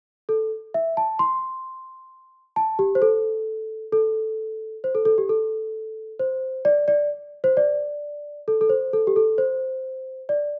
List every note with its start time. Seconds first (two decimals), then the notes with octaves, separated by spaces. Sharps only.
0.29 A4
0.74 E5
0.97 A5
1.19 C6
2.56 A5
2.79 G4
2.95 C5
3.02 A4
3.93 A4
4.84 C5
4.95 A4
5.05 A4
5.18 G4
5.29 A4
6.19 C5
6.65 D5
6.88 D5
7.44 C5
7.57 D5
8.48 A4
8.61 A4
8.69 C5
8.93 A4
9.07 G4
9.16 A4
9.38 C5
10.29 D5